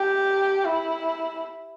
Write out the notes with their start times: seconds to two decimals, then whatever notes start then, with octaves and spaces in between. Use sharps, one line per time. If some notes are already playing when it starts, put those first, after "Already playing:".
Already playing: G4
0.65 E4